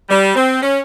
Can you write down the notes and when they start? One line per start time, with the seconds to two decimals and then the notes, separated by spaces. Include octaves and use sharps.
0.09 G3
0.35 C4
0.61 C#4